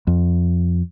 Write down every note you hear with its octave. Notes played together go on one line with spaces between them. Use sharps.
F2